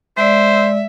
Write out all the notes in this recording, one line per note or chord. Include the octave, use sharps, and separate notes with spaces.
G#3 C5 D5 E5